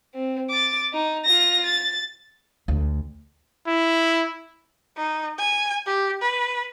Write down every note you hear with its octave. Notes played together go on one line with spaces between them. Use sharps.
C4
D6 A6
D#4
F4 A#6
A6
D2
E4
D#4
G#5
G4
B4